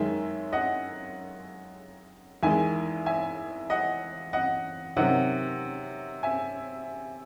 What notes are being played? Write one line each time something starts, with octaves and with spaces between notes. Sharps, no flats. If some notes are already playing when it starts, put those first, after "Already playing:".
Already playing: F#2 D#3 G#3 E5 G#5
D#5 F#5
E2 D#3 G#3 E5 G#5
E5 G#5
D#5 F#5
D#5 F#5
C3 D#3 F#3 D#5 F#5
E5 G#5